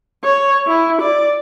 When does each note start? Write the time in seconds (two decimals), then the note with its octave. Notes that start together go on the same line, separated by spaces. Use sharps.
0.24 C#5
0.67 E4
1.02 D5